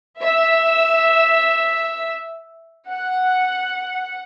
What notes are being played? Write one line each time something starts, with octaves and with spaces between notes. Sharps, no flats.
E5
F#5